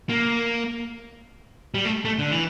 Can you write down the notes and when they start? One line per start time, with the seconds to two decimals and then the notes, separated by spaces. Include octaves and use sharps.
0.09 A#3
1.74 G3
1.85 A3
2.05 A3
2.19 D3
2.32 E3